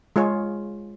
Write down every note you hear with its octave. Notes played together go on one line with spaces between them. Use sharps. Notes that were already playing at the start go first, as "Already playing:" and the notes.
G#3 F4 G#4 C#5